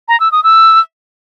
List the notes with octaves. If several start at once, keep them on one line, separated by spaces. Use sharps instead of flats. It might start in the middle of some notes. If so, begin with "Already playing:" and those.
A#5
E6
D#6
E6